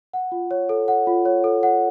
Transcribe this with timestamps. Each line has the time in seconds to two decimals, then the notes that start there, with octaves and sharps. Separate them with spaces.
0.13 F#5
0.32 F4
0.51 C#5
0.69 A4
0.88 F#5
1.07 F4
1.25 C#5
1.44 A4
1.63 F#5